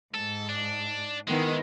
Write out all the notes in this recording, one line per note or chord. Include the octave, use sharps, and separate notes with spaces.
G#2 A4
D4
D#3 G#3 B3 E4